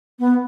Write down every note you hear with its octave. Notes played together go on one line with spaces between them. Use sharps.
B3